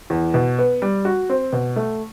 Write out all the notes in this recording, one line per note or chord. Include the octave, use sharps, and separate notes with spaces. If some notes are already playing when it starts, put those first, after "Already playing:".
E2
B2
B3
G3
F#4
C4
B2
A3